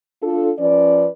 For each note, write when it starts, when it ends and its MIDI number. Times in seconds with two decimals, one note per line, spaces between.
0.22 0.51 62
0.22 0.51 65
0.22 0.51 69
0.59 1.08 53
0.59 1.08 61
0.59 1.08 71
0.59 1.08 74